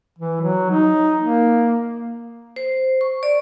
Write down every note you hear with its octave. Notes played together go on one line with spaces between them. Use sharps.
E3
F#3
D#4
A#3
C5
C#6
D5